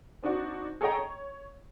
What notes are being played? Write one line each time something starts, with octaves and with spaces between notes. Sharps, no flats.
C4 D4 D#4 F#4 D5
G#4 A4 C#5 D#5 G5 A#5
C#5